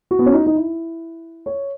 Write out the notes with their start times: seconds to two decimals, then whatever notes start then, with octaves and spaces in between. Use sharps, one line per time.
0.11 F#4
0.19 B3
0.26 C#4
0.33 D#4
0.46 D#4
0.55 E4
1.46 C#5